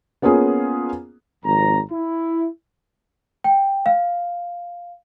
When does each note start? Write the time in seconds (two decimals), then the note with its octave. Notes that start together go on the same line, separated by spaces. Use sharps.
0.22 A#3 B3 C#4 F4 G#4
1.45 G#1 F2 A#5
1.92 E4
3.44 G5
3.86 F5